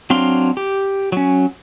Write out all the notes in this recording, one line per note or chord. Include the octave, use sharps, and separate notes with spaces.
F#3 C4 D4 F5 C6
G4
F#3 C#4